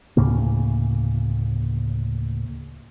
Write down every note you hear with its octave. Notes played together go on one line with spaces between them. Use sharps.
D2 A2 C#3 A#3